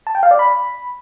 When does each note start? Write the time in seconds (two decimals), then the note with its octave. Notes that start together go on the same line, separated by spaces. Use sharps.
0.07 A5
0.15 G5
0.23 F5
0.31 D5
0.39 B5